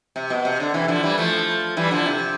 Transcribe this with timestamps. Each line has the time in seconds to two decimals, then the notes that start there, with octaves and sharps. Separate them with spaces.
0.16 C3
0.30 B2
0.45 C3
0.60 D3
0.74 C3 E3
0.88 D3 F3
1.03 E3 G3
1.18 F3 A3
1.77 E3 G3
1.91 D3 F3
2.06 C3